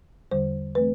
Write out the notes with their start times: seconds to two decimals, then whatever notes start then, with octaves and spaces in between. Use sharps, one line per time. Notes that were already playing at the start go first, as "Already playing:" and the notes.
0.31 E2 D3 G3 C5
0.75 E3 A3 C4 B4